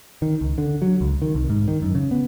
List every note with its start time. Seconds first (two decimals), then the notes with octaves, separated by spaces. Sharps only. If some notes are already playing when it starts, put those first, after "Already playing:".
0.22 D#3
0.41 C#2
0.58 D3
0.82 F#3
1.01 C#2
1.22 D#3
1.35 C2
1.50 G#2
1.68 D#3
1.82 F#2
1.95 C#3
2.11 B3